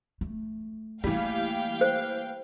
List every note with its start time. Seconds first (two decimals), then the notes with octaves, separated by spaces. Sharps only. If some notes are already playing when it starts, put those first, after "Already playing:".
0.21 A3
1.04 E3 G3 A3 A#3 F5 G5
1.81 C5